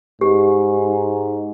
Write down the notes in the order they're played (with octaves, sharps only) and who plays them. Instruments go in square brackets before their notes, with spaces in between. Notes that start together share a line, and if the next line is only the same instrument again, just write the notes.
[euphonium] G#2 [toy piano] G4